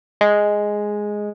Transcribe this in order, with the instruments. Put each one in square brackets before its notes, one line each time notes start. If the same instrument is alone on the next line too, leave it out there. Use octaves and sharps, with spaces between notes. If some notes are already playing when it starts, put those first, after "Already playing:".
[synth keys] G#3